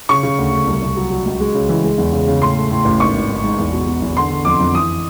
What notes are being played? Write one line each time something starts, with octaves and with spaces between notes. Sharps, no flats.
C#3 C#6
C#3
D2
D2
C2
C2
F#3
F#3
C#2
G#3
C#3
E3
G#3
E2
C#3
C#3
A2 C6
A3
A2
A1
G#1 C#6
G#1
G#1
G#2
E2
B2
B2
E2
D3 C6
D3
F2 D6
F2
E3 D#6